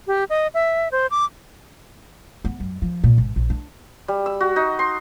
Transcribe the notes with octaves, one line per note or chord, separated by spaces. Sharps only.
G4
D#5
E5
C5
D6
B3
F#2
F3
A#2
G#1
A#1
D4
G3
E6
F#4
D#4
C6